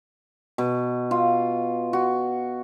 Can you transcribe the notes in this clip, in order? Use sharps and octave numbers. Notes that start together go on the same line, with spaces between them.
B2
F4
F#4